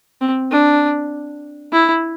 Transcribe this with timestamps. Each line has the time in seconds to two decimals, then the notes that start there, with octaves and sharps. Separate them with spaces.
0.21 C4
0.51 D4
1.73 E4